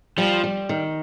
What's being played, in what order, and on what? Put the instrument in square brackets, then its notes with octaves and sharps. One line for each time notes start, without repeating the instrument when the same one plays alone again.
[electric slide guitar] F3 [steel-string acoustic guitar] G3
[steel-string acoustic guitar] G3
D#3